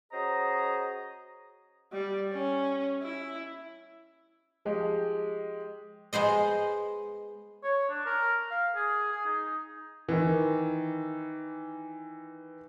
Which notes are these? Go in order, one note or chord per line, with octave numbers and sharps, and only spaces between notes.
C#4 F#4 G#4 C5 D#5 A#5
G3
C#4
E4
F3 G#3 G4
G#3 B3 C5 D#5
C#5
D4
A#4
F5
G#4
G#4
D#4
D#3 E3